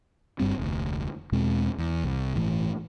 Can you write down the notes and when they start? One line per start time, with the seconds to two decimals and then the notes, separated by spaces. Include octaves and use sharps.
0.40 G1 G2 G3 C4
0.57 F1 D2
1.32 E2 B2 G#3 C4
1.78 E2
2.04 C2
2.34 G1 A2 E3 A3